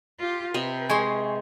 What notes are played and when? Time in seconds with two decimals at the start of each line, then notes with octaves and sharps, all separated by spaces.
0.19 F4 G4
0.54 C3 B4 D#5
0.90 G#3 G#5 C6 C#6